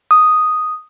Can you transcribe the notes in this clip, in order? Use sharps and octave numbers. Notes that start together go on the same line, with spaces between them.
D#6